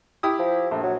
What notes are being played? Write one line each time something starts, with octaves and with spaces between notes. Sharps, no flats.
E4 G4 D#6
F3
A#1 A3
F#3